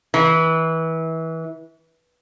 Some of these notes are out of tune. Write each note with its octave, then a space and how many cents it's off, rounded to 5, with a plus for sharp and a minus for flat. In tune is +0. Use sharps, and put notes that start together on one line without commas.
E3 -25